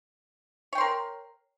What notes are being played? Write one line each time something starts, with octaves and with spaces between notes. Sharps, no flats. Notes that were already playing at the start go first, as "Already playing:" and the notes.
A#4 C#5 G5 C6